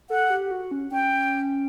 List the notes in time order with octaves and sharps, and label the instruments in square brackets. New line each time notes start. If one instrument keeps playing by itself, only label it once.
[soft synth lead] A4 [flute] F#5
[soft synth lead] G4
F#4
C#4
[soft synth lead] C#4 [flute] G5